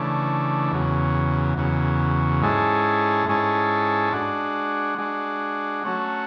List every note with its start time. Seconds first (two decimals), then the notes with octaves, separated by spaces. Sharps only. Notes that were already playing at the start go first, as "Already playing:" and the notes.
Already playing: C#3 E3 A3 D4
0.72 E2 C#3 F#3
1.57 E2 C#3 F#3
2.42 G#2 G#3 C#4 E4 A4
3.27 G#2 G#3 C#4 E4 A4
4.13 G#3 D4 F#4
4.98 G#3 D4 F#4
5.84 F#3 A3 C#4 F#4